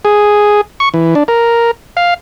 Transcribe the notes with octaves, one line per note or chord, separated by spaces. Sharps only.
G#4
C#6
E3
D4
A#4
F5